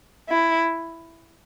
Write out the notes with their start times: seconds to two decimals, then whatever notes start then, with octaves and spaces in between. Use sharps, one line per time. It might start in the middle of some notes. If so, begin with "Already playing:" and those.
0.29 E4